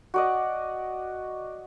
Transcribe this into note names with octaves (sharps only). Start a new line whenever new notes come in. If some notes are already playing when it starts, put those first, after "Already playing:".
F#4 D5 D#5